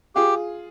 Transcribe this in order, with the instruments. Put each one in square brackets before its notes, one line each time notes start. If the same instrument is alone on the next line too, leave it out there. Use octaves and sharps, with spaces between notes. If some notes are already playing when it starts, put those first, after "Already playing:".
[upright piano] F4 G#4 [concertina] G4